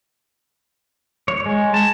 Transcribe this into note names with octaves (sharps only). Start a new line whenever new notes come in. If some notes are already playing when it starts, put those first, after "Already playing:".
C#5
G#3
A5